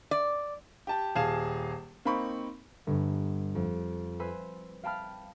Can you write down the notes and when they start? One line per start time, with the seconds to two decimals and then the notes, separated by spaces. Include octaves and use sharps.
0.11 D5
0.87 G4 A5
1.15 D#1 G#4 F5 A5 E7
2.05 A#3 C4 D#4 B5 C#6
2.87 G1 G2
3.55 F2
4.19 B4 C5 G#5 B5 E6
4.84 F5 G5 A5 B5 F6